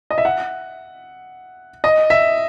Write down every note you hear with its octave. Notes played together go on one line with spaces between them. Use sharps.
D#5
E5
F#5
D#5
E5